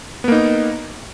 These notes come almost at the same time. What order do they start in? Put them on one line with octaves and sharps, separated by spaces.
B3 A#3 D#4